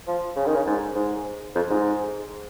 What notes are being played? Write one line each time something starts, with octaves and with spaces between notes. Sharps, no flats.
F3
C#3
D#3
C#3
G#2
G#2
F2
G#2